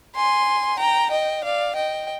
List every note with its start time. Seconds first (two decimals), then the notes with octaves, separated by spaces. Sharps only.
0.15 G#5 C6
0.79 G5 A#5
1.11 D#5 G5
1.43 D5 F5
1.75 D#5 G5